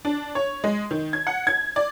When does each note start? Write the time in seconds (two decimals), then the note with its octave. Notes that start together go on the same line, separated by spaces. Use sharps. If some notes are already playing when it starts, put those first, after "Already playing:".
0.05 D4
0.35 C#5
0.64 G#3
0.91 D#3
1.13 G#6
1.27 F#5
1.47 G#6
1.76 D5